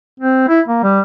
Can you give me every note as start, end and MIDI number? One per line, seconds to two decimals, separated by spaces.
0.20 0.45 60
0.48 0.61 64
0.68 0.81 58
0.84 1.01 55